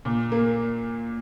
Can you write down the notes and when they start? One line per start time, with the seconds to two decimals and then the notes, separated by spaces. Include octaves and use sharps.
0.05 A#2
0.32 A#3